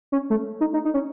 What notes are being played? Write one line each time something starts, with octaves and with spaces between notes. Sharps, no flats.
C#4
A3
D#4
D#4
D#4
C#4